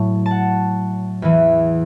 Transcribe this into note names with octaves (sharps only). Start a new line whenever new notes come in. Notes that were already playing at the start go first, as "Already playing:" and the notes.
Already playing: A2 F#3 A5
A5
F#5
E2 E3